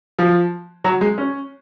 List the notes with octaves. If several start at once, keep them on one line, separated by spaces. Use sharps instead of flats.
F3
F#3
G#3
C#4